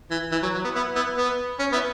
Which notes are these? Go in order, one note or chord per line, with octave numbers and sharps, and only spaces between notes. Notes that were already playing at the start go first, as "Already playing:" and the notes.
E3
E3
F#3
F#3
B3
B3 E4
B3 E4
B3
C#4
B3 E4